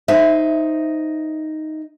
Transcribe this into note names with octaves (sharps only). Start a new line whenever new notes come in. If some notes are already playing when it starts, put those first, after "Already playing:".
D#4 C5 E5